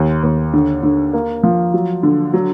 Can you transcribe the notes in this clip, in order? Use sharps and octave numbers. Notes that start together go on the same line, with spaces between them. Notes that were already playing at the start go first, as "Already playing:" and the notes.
Already playing: D#2
D#2
D3
D3
A#3
F3
F#3
D3
F#3